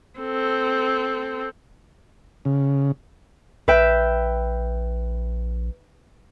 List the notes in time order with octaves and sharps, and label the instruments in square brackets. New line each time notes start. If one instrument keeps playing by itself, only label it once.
[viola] C4 A4
[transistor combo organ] C#3
[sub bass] A#1 [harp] B4 E5 G5